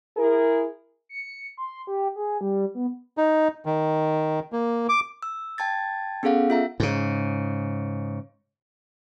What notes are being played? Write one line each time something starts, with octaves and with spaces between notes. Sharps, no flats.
E4 G#4 A#4
C#7
C6
G4
G#4
G3
B3
D#4
D#3
A#3
D6
E6
G5 A5 G#6 A6
B3 C#4 G#4 A4 F5 F#5
F4 E5 A#5
G#2 C#3